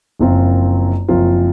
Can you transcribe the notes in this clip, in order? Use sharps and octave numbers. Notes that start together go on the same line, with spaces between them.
F#1 F#2 F3 C4 F4
F#1 F#2 F3 C4 F4